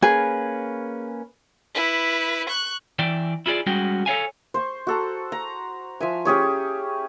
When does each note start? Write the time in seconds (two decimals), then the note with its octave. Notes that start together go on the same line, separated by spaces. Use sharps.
0.03 A#3 C#4 G#4 B4
1.75 E4 B4
2.49 C#6 F#6
2.99 E3 D5 E5 G5
3.46 E4 F4 G#4 D5
3.66 G3 G#3 C#4 F#4 G#4 G5
4.06 A4 C#5 F5 G#5
4.54 C5 C#6
4.87 F#4 A4 A#5
5.32 A#5
6.00 F3 E5 G#5
6.25 C#4 G4 G#4 C#5